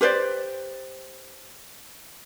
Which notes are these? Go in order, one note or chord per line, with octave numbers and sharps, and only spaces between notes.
G4 B4 C5 D5